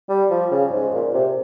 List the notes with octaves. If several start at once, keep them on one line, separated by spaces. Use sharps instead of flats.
G3
F3
C#3
G#2
A#2
C3